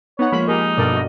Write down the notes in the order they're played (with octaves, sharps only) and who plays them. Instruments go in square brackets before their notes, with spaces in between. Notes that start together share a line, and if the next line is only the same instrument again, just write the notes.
[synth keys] B3 D#4 F#5 [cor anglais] C#5
[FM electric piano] F3 A#3 F4 [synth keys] G#3 [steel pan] B5
[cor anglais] D#4 [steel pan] G4 G#4 A#4
[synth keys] G2 B2 [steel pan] A4 A#4 D5
[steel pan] F#4 D#5